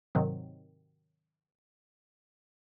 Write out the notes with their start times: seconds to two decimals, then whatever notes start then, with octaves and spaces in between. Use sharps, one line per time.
0.15 G#2 C3 D#3 F#3 C4